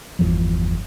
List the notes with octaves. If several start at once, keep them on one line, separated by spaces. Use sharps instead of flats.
G1 E2 F3